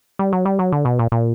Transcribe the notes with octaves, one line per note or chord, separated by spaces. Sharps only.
G3
F#3
G3
F#3
D3
B2
A#2
A#2